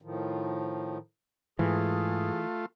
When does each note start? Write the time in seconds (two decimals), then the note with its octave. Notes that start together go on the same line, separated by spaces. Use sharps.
0.02 A2 D#3 F3
1.59 G#2 E3 A3 F4 G#4